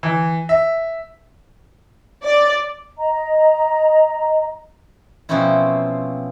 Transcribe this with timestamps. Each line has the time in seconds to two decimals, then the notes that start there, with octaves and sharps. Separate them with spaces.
0.03 E3
0.49 E5
2.24 D5
2.97 D#5 A#5
5.29 B2 F3 C4 C#4 E4